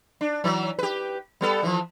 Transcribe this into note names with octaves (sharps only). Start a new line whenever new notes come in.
D4
E3 F#3
G4 B4
G3 B3 A4
E3 F3